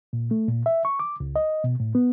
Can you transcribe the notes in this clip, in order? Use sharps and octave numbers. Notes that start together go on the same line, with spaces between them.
A#2
A3
A#2
E5
C#6
D6
C#2
D#5
B2
A2
B3